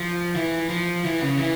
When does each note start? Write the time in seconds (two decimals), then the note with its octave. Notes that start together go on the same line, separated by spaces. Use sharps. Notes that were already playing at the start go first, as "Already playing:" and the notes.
Already playing: F3
0.35 E3
0.69 F3
1.05 E3
1.22 C#3
1.39 E3